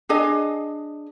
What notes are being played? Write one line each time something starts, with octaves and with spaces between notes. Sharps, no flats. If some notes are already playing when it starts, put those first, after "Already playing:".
D4 G#4 D#5 G#5